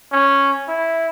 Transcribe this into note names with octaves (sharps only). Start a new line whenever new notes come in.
C#4
E4